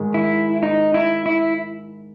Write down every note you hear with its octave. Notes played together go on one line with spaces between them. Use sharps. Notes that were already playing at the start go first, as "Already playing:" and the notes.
Already playing: G#2 D#3 G#3
E4
D#4
E4
E4